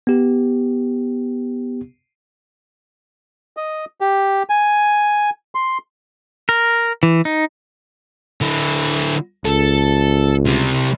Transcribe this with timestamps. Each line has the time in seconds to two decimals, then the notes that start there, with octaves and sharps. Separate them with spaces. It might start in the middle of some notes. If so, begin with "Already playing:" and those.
0.07 B3 G4
3.57 D#5
4.01 G4
4.50 G#5
5.55 C6
6.49 A#4
7.03 E3
7.25 D#4
8.41 D3 E4
9.45 C#2 A4
10.45 C3 G3